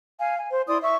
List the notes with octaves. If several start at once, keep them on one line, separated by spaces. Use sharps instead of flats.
F5 G#5
G#5
C5
E4 D5 C6 D#6
E5 C#6